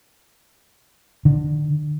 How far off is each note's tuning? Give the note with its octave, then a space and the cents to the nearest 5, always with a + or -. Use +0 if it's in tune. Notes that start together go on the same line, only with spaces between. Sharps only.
D3 +25